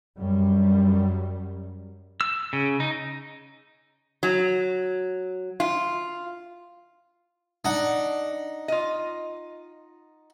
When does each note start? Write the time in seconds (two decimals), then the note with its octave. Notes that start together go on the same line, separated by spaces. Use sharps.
0.19 F#2 G3
2.21 E6
2.53 C#3
2.80 D#4
4.23 F#3
5.60 F4
7.65 D4 D#4 F#5
8.68 F4 D#5